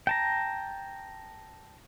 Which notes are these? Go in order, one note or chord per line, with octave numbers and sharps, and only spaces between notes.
G5 A5 A#5